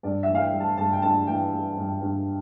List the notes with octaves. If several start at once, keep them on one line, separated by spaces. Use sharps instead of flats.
G2 D5
E5
E3
F5
G5
G3
A5
G2 A5
G5
G2 A5
E3 G5
G3
G2
G2